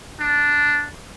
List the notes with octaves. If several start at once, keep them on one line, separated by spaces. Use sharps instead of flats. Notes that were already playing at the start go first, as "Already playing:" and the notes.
D4